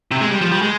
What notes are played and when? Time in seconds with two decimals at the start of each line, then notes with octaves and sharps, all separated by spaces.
0.11 C3
0.21 G#3
0.31 G3
0.41 F3
0.52 G3
0.62 G#3